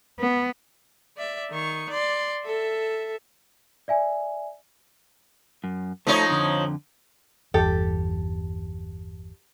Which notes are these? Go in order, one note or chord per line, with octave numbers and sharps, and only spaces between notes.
B3
D5 E5
D#3 C#6
D5 C6
A4 E5
D5 E5 G#5
F#2
F3 A3 D#4 A4 C#5
F2 D3
G1 E2 G4 A4